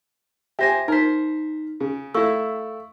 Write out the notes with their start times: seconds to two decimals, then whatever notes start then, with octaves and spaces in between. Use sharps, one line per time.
0.59 G4 C5 E5 G#5 A#6
0.88 D#4 A#4 C5 B6
1.80 C#3
2.14 A3 E4 F5 C#6 E6